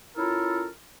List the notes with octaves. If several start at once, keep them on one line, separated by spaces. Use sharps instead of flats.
C#4 E4 F4 A4 A#4